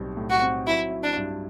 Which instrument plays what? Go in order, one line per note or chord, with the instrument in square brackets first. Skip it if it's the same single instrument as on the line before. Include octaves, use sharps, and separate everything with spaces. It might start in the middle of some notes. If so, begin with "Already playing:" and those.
Already playing: [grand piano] B1 A2 G3 C4
A2
[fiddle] F#4
[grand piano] C4
[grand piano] F#3 [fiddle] E4
[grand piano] E4
[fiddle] D4
[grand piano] G2